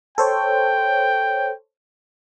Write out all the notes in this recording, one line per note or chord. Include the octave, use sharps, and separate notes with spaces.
A4 C5 C#5 G5